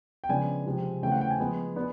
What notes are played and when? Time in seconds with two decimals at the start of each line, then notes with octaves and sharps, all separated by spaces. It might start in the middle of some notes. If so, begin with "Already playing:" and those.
0.24 G5
0.29 C#3 F3 G#3 B3 D4 G#5
0.66 C3 F3 G#3 C4
1.02 C#3 E3 A3 C4 G5
1.12 F#5
1.21 G5
1.31 G#5
1.40 F3 G#3 B3
1.76 B3 D4